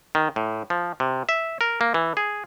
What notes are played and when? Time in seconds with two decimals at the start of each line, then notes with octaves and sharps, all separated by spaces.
0.15 D#3
0.36 A2
0.70 F3
1.00 C3
1.29 E5
1.61 A#4
1.81 A#3
1.94 E3
2.17 G#4